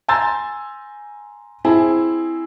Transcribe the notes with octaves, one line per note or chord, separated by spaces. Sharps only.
G#5 A#5 C6 E6 G6 A6
C4 E4 G#4 G#5